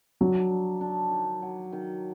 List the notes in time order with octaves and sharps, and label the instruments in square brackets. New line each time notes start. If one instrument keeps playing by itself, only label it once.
[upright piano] F#3 [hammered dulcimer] D4
[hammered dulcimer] D4
D4
D#3
F#3
D#3